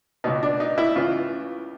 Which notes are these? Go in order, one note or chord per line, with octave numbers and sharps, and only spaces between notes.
C#2 B2 D#4
D4
D#4
E4
C#2 C#3 E3 F4